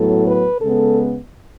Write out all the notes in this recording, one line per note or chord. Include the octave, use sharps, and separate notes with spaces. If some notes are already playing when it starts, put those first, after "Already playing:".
Already playing: A2 F#3 B3 A4
B4
C#3 G#3 B3 A4